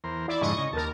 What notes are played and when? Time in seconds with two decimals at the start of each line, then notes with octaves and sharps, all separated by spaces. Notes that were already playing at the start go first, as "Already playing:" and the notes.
0.04 E2 A#4 C5
0.28 E4 D5
0.41 F2 G#2 D3 D#5 C#6
0.58 C#3
0.73 D#2 A#4 A5